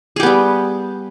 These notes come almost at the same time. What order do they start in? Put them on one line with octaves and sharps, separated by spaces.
G#4 G4 B3 G3